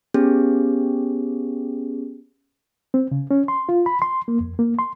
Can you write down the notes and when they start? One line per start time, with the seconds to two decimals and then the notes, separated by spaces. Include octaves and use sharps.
0.14 B3 C#4 G4 G#4
2.94 C4
3.12 C#3
3.31 C#4
3.48 C6
3.69 F4
3.86 B5
4.02 C6
4.28 A#3
4.41 F2
4.59 A#3
4.79 C6